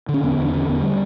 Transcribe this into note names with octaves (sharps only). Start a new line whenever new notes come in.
D3
C#4
E2 B3
E2
D4
D3 C#4
E2 B3
G3